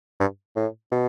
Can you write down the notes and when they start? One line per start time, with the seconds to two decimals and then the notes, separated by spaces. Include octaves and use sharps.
0.20 G2
0.56 A2
0.92 B2